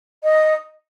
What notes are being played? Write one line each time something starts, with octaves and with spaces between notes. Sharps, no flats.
D#5